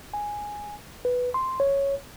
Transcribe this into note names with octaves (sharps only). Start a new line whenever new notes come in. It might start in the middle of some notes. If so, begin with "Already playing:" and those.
G#5
B4
C6
C#5